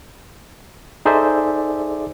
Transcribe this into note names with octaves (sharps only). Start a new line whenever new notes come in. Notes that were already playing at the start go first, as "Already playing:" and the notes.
D#4 G#4 A4 C5 D5 E5